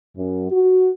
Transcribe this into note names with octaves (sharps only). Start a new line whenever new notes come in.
F#2
F#4